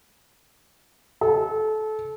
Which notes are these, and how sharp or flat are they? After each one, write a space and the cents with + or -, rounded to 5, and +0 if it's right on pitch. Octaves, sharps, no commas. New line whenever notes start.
A4 -25